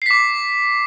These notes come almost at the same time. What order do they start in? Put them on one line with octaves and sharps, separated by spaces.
C7 B6 D6